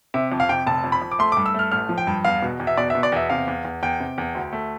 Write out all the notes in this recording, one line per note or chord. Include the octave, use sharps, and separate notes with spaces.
C3 E5
F2
F5
C3 G5
F1 A5
F2
B5
F2
D6
A3 C6
D6
G2
E6
A3 F6
A1 F6
F3
G5
G2
E2 F5
B2
E2
E5
B2 D5
E5
B2
D5
E2 E5
C3 F5
E2
E2
E2 G5
C3
E2
D2
A3